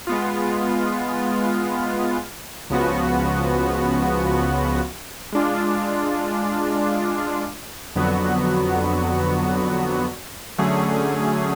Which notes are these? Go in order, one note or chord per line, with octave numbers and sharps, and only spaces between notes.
G#3 B3 F4
C#2 C#3 F3 B3 F#4
G#3 D4 F4
F2 D3 F#3 B3 F#4
D3 F#3 A3 C#4 G#4